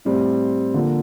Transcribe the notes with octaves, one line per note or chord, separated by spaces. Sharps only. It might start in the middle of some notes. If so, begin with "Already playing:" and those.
A2 G3 C4
D3 F3 A#3